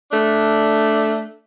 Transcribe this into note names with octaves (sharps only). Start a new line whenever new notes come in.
A3 D4